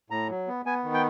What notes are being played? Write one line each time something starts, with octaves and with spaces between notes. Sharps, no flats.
A2 A#5
F#3
B3
B3 G#5
D#3
G5